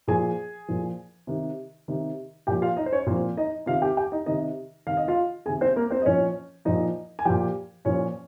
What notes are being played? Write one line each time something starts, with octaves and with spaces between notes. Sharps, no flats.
A#2 F3 G#4 G#5
A#2 F3
C3 D#3
C3 D#3
A#2 F3 G4 G5
F4 F5
D#4 D#5
C5
C#4 C#5
A#2 F3 C4 C5
D#4 D#5
C3 D#3 F4 F5
G4 G5
G4 G5
D#4 D#5
C3 D#3 D#4 D#5
C3 D#3 F5
D#5
F4 F5
C3 D#3 G#4 G#5
C4 C5
A#3 A#4
C4 C5
D#5
A#2 F3 C#4 C#5
A#2 F3 D#4 D#5
G#5
A#2 F3 G4 G5
A#2 F3 C#4 C#5